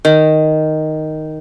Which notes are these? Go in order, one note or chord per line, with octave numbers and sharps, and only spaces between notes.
D#3